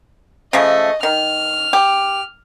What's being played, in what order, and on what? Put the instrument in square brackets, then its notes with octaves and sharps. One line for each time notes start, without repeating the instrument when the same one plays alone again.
[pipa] C#3 F3 A3 [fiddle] D#5
[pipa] D#3 [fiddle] F6
[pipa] G4